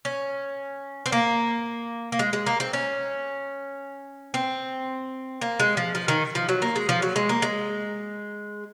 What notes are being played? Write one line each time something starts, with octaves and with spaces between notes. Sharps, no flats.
C#4
C4
A#3
A#3
G#3
G#3
A#3
C4
C#4
C4
A#3
G#3
F3
F3
D#3
F3
F#3
A#3
G#3
F3
F#3
G#3
A#3
G#3